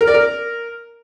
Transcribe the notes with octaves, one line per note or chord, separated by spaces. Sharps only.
A#4
D5
A#4